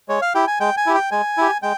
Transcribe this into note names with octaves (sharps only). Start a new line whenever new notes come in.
G#3 C#5
F5
E4 G4 G5
G#5
G#3 G5
G#5
E4 G4
G5
G#3 G#5
E4 G4
G#3 G5